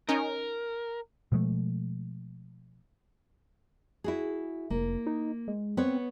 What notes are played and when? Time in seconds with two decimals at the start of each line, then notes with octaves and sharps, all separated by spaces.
0.09 C#4 D#4 A#4
1.32 B2 F3 G#3 A3
4.04 E4 F#4 G#4
4.70 F1 A#3
5.07 D#4
5.48 G#3
5.77 B3 C4 B4 C#5